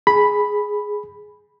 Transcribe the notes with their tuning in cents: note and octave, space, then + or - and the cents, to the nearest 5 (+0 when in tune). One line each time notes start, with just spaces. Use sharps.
G#4 +5 B5 +0